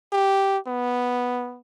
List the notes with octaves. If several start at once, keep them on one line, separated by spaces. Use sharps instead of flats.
G4
B3